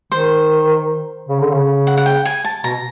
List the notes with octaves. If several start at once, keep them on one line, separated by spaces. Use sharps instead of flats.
D#3 C5
C#3
D3
C#3
F#5
F#5
G5
G#5
A5
B2 A#5